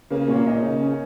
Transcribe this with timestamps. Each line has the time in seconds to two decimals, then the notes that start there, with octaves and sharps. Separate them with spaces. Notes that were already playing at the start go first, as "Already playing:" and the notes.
0.10 C#3 A#3 A#4
0.28 A#2 C#4 C#5
0.46 A#2 D#4 D#5
0.64 C#3 D#4
0.82 C#4